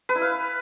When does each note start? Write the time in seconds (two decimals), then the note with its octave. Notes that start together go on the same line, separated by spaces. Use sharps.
0.09 B4
0.15 E4
0.21 F5